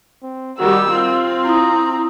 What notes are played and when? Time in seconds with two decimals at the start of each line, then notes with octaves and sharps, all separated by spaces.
0.23 C4
0.59 D#3 G3 F#4 E6
0.90 C4 F4
1.46 E4 A#5 D#6